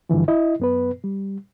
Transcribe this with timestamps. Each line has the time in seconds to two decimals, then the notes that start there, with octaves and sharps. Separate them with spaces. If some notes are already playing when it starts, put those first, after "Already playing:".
0.09 G2 D3 E3 F3
0.28 E4 D#5
0.60 F#2 B3 B4
1.04 G3